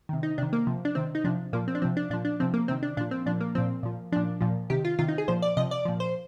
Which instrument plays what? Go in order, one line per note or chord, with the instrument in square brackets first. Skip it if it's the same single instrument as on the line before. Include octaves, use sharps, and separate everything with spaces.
[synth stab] C3 D#3
D#4
C3 D#3 D4
A#3
C3 F3
D4
C3 D#3 C4
D#4
C3 F3 D4
A#2 F3 A#3
C4
D4
C3 F3 C4
D4
A#2 F3 D4
D4
C3 F3 C4
A#3
C3 D#3 C4
D4
A#2 D4
F3
C4
A#2 F3 D4
A#3
A#2 F3 C4
A#2 F3
A#2 F3 D4
A#2 F3
C3 D#3 G4
F4
C3 D#3 F4
D#4
G#4
A#2 F3 C5
D5
C3 F3 D#5
D5
A#2 F3
C5